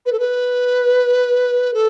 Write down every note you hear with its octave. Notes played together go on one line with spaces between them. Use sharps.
B4
A4
B4
A4